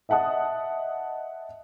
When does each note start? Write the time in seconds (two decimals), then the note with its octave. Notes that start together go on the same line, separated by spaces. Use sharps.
0.09 D#5 E5 F#5 A5 D#6